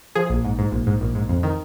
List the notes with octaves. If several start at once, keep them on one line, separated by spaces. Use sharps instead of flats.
F3 G#4
A#1
G#2
G#2
A#1
G#2
A#1
G#2
F2
D#3